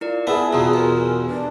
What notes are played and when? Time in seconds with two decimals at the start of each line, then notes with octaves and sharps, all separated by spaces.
0.01 E4 F4 A#4 D5
0.27 B3 G#4 E5 A5
0.53 E2 B2 F4 A#5 C6
0.73 G4 A#4 G#5
1.29 D4